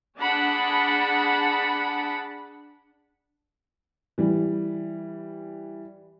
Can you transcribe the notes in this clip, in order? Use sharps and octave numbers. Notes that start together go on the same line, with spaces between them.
D4 G#4 F#5 A5 B5
E3 G3